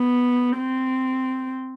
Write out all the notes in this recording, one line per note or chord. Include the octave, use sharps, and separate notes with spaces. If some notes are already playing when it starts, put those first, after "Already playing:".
Already playing: B3
C4